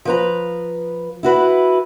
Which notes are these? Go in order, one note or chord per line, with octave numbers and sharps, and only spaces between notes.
F3 B4 A#5
E4 F#4 B4